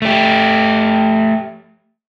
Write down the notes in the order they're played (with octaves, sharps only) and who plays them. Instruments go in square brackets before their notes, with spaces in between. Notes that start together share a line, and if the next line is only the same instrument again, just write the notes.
[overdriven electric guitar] A3 G4